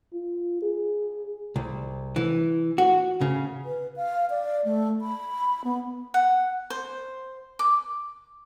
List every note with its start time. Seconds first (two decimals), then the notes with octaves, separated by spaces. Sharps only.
0.13 F4
0.62 G#4
1.56 C2
2.16 E3
2.78 F#4
3.21 C#3
3.65 B4
3.96 F5
4.30 D5
4.65 A3
5.01 B5
5.64 B3
6.14 F#5
6.70 C5
7.59 D6